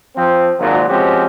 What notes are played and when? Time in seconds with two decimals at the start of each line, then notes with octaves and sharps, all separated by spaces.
0.16 F3 C4
0.59 G#1 A#2 F#3
0.89 F3 G#3 C4 C#4 F#4 G4